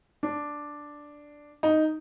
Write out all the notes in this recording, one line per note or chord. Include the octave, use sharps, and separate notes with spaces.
D4
D#4